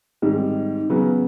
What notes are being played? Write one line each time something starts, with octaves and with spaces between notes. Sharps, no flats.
G#2 D#3 G3 C4
C#3 F#3 B3